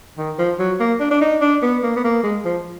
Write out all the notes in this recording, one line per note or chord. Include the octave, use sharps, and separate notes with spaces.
D#3
F3
F#3
A#3
D4
D4
D#4
D4
B3
A#3
B3
A#3
G#3
F3